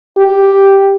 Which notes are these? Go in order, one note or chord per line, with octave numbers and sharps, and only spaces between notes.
G4